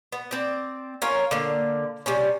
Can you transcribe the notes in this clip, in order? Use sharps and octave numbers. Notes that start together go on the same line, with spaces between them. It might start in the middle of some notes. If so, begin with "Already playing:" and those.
B3
C4 D5
C#4 F4 A#4 C#5
D3 A#3
C3 G3 C#4